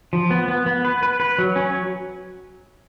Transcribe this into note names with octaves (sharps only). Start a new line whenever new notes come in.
F3
B3
B3
B3
B4
B4
B4
F#3
C#4